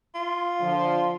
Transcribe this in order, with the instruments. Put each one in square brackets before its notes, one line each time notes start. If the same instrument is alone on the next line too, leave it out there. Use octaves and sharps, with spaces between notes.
[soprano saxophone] F4
[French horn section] D3 F3